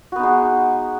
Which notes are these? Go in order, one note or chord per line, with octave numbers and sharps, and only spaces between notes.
G#3 B3 D#4 F#4